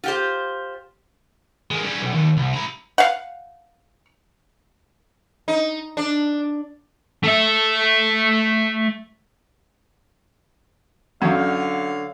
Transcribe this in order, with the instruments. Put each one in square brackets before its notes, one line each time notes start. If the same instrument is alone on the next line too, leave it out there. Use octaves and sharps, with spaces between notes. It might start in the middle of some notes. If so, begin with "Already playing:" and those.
[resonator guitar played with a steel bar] F4 G4 C5
[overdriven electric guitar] G#3 A#3
G3 C#4
B1
D#2
C2
E4 A#5
[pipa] F5 F#5
[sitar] D#4
D4
[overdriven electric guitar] A3 E5
[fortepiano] F#2 [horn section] D3 C#5 F5